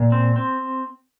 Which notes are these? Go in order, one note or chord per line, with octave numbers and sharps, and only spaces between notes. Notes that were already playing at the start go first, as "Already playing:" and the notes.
Already playing: A#2
C4
C4